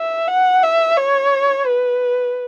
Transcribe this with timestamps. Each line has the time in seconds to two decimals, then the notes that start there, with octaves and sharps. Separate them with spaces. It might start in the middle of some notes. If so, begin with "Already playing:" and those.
Already playing: E5
0.28 F#5
0.63 E5
0.97 C#5
1.66 B4